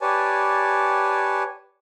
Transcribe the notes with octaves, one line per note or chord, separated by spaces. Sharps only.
G4 B4 C#5 D5 G#5 A5